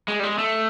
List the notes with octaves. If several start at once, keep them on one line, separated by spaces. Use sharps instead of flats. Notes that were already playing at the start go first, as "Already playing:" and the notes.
G#3
G3
G#3
A3